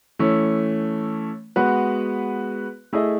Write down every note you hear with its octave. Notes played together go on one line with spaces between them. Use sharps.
E3 A3 C#4
G#3 B3 F#4 B4
A3 E4 G#4 D#5